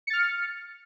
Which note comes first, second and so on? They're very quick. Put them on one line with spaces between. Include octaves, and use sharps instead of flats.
C#7 A6 F6